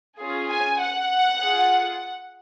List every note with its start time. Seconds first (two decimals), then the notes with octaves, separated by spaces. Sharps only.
0.18 C#4 F4 G#4
0.50 G#5
0.80 F#5
1.42 F4 G#4